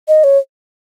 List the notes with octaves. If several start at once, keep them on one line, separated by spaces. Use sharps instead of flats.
D#5
C#5